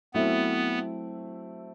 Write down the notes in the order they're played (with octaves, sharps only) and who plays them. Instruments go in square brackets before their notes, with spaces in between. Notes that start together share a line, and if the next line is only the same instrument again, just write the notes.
[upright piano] F#3 A3 C4 E4 [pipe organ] B3